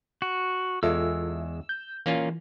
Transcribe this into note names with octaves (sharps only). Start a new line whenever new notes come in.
F#4
E2 G#3 F4 A4 E5 E6
G6
E3 A#3 C#4 F4